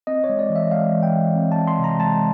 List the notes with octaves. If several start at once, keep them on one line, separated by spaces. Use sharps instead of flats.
C4 D#5
C#5
G#3
D5
E3
E5
G#3 F5
E3
G5
E3
C4
A5
C4
C6
C3
A#5
G#3 A5